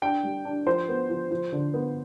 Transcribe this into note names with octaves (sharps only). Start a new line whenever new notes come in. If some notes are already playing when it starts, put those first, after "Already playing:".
D4 G5
G3
D4
F3 C5
B3
F3
F3
D3
B3